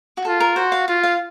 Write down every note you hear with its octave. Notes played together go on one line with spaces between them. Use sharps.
F#4
F4 A4
A#4
F#4 C5
F5
F4 F5
F5